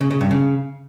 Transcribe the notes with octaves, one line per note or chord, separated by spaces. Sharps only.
C#3
C#3
G2
C#3